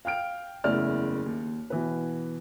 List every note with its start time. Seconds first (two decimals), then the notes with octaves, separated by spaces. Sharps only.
0.05 F5 G5 F6 D7
0.64 F#1 E2 A3 E4 D5 F6
1.26 D#2
1.70 B2 E3 B4